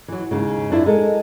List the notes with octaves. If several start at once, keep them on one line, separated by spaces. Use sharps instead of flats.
E3 F#3
D#2 G#2 C#3
F#2 D4 E4 F4
G#3 A4 A#4